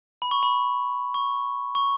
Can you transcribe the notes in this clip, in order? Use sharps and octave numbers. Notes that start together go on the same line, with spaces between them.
B5
C#6
B5
C#6
C#6